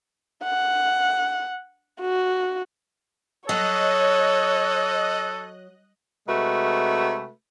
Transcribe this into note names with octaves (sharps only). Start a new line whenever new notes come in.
F#5
F#4
F#3 A4 C#5 D#5 F#6
C3 G#3 A3 F#4 B4